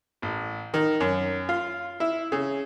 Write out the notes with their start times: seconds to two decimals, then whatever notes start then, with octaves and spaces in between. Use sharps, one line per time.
0.22 A1
0.74 D#3
1.00 F#2
1.49 F4
2.00 E4
2.32 C#3